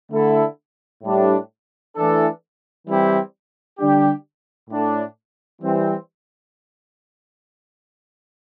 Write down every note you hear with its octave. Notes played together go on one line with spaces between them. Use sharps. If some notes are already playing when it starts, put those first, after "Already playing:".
D3 A3 E4 A4
A2 G3 D4 G4
E3 A3 D4 A4
E3 G3 C4 E4 G4
D3 G3 D4 G4
A2 A3 D4
E3 G3 C4